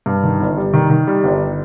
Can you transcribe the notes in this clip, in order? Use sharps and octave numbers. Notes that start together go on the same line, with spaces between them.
G2
D#3
G1
G3
D#3
D#3
G3
G1